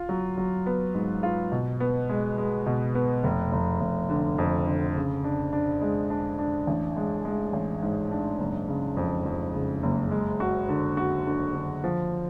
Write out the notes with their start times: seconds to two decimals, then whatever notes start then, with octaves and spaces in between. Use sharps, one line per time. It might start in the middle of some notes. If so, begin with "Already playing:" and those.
Already playing: F4
0.09 F#3
0.37 F#3
0.66 B3
0.94 G#2
1.23 F4
1.52 B2
1.80 B3
2.09 G#3
2.38 G#3
2.66 B2
2.95 B3
3.24 F1
3.52 F1
3.81 F1
4.10 D3
4.38 F2
4.67 D3
4.96 C#3
5.24 D4
5.53 D4
5.82 G#3
6.10 D4
6.39 D4
6.67 A1
6.97 G#3
7.25 G#3
7.53 A1
7.82 G#2
8.11 D4
8.39 F#1
8.68 C#3
8.97 F2
9.26 F2
9.54 C#3
9.83 F#1
10.11 G#3
10.40 F#4
10.69 D3
10.97 F#4
11.26 D3
11.55 D3
11.84 F3